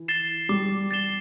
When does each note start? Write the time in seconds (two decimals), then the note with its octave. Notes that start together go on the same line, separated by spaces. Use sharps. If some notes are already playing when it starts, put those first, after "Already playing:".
Already playing: E3
0.08 A6 C7 E7 G7
0.49 G3 D6
0.91 A6 C7 E7 G7